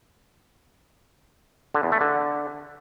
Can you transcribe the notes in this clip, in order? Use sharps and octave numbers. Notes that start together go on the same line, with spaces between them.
D3
E2
A3
D3